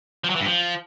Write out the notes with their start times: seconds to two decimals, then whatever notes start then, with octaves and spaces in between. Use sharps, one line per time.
0.24 F3
0.30 F#3
0.35 E3
0.41 G2
0.46 F3